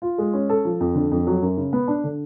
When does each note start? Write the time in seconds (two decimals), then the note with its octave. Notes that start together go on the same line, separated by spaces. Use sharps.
0.02 F4
0.18 G#3
0.33 C#4
0.49 A4
0.65 F3
0.80 F2
0.95 D3
1.11 F2
1.27 F#3
1.42 F#2
1.57 C#3
1.73 B3
1.88 D4
2.04 D3